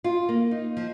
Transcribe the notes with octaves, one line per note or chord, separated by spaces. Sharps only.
F4
A#3
D#4
F3